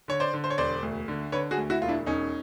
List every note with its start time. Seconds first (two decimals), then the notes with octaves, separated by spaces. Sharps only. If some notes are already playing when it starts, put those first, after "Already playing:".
0.08 D3 C#5
0.20 C5 D5
0.34 D3
0.44 C5
0.50 C#5
0.58 E1 C5 D5
0.83 D2
1.08 D3
1.32 D3 B4 C#5
1.51 F#4 G#4
1.57 D2
1.70 E4 F#4
1.82 E1 F4
1.88 D4 E4
2.06 E1 C#4 D#4